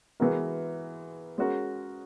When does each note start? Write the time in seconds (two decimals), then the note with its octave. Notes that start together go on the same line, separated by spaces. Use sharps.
0.20 E3 G#3 B3 F#4 A#4
1.38 G#3 C#4 F#4 A#4